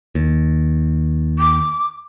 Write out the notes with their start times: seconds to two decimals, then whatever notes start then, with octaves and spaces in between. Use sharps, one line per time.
0.15 D#2
1.38 D6